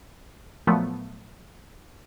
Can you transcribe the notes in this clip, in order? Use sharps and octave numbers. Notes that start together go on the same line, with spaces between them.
A#2 F3 F#3 A3 B3